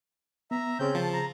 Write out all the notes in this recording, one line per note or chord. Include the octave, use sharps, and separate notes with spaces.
B3 E5 A#5
C#3 C4 C#4 G#4 G6
F3 A5
A#5